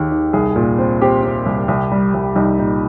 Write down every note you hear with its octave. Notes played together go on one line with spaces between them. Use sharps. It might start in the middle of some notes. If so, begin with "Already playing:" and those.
Already playing: D#2 D#3 G4 G#4
D#3
C2 G#4
A#2
C4
C4 G4
C4
C2
C2
G3
C2
C2 D#4
A#2 D#4